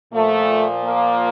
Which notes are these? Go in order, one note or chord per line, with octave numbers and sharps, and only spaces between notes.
A#2 F3 A3
A#3